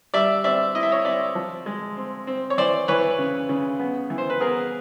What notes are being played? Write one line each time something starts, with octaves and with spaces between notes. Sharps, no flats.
G3 D5 E5
C4 D5 E5
E4 D#5
E5
C#5 D#5
C4 D5 E5
F3
G#3
C4
C4
C#5
E3 C5 D5
E3 B4 C#5
C#3
C#3
B3
E3
C5
B4
B3 G#4 A#4